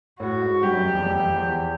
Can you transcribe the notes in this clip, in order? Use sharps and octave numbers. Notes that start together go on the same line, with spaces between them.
A2 F#4
G#2
G2 G4
F#2
F2
E2
F2
F2
E2
E2